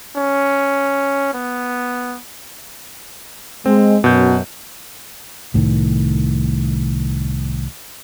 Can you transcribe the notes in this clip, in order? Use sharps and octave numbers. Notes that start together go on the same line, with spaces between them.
C#4
B3
G#3 C4
F#2 B2 G6
C2 A2 D#3